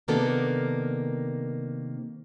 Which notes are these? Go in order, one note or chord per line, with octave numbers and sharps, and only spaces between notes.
C3 D#3 A#3 B3 D4 A4